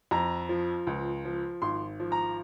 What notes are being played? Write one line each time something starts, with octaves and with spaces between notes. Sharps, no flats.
F2 A#5
F3
C#2
F3
G#1 C6
F3
A#5